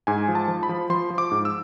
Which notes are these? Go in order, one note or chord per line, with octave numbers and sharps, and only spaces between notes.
G#2 G#5
F3
A5
F3
B5
F3
F3 C6
F3
D6
G#2
E6